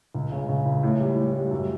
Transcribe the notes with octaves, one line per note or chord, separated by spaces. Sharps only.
C#2
C#3
C#3
C#2
A2
G3
A2
G3
F#2